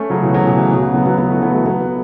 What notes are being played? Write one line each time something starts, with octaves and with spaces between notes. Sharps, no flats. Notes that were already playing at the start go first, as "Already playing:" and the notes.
Already playing: A3 C#4
C#3 F#3
B2 E3
C#3 F#3
B2 E3
C#3
B2
C#3
F#3 B3
F#3 B3
F#3 B3
E3 A3
F#3 B3
E3 A3
F#3 B3